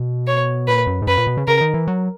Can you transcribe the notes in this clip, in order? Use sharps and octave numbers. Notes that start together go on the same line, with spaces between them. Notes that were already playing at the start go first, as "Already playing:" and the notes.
Already playing: B2
C#5
A#2 B4
F#2
G#2
F#2 B4
A#2
B2
C#3
C#3 A#4
D#3
E3
F#3